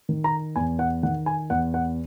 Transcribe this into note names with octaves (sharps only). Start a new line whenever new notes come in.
D#3
A#5
E2 G#5
F#5
D#3 F#5
G#5
E2 F#5
F#5